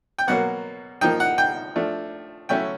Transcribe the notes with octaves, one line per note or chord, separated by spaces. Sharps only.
G5
B2 F#3 A#3 F#5
F3 A#3 D#4 G5
F#5
G5
F3 A3 D4
F#3 A3 C#4 E4 G5